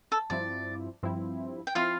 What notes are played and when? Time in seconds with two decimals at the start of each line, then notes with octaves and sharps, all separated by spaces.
0.12 A4
0.30 G2 F3 C4 E4 D5
1.03 G2 F3 C4 E4
1.67 G5
1.75 F3 C4 E4 F4 F5